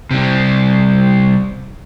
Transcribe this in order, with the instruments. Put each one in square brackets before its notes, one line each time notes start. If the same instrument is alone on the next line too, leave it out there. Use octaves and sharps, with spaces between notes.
[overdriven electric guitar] C3 G3